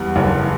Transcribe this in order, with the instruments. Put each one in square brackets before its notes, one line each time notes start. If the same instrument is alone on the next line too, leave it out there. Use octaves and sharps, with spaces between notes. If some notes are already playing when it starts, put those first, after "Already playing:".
Already playing: [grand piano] E2 G3
F#1